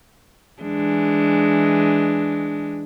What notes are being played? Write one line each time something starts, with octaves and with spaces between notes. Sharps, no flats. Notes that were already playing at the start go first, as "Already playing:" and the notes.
E3 G#3 D4